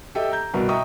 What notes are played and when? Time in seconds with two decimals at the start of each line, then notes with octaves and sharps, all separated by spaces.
0.15 G4 A4 D#5 E5 G5
0.32 A#5 G6
0.54 C2 B2 F#4 A#4 B4
0.69 D#5 E5 G5 A#5 C#6 D#6